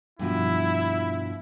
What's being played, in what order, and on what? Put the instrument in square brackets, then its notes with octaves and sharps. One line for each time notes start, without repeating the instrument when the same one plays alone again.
[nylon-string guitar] G2 B2 F3 [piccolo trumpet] E4